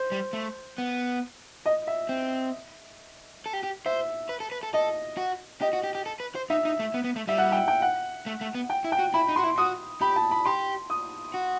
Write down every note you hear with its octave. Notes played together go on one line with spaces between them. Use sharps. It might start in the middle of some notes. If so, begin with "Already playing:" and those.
Already playing: C5
G3
A3
B3
D#5
E5
C4
A4
G4
G4
C5 E5
B4
A4
B4
A4
A4 D#5
F#4
G4 D#5
F#4
G4
G4
A4
B4
C5
D#4 E5
D#4
A3
B3
B3
A3
G3 E5
F#5
G5
G5
F#5
A3
A3
B3
G5
E4
G5
F#4
E4 B5
D#4
C6
F#4
E4
F#4 D#6
G4 B5
A5
B5
G4 C6
D#6
F#4